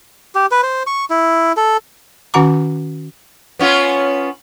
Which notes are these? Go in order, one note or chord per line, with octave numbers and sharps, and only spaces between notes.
G4
B4
C5
C#6
E4
A4
D#3 C#4 F#4 F#5 A#5 D6
B3 C#4 F4